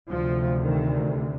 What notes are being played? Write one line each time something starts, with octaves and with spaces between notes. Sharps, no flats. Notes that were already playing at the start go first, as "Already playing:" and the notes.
D2 C3 F3
D#3